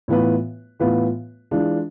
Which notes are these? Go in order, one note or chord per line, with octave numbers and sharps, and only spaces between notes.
A2 E3 B3 F4 B4
A2 E3 B3 F4 B4
E3 G#3 D4 F4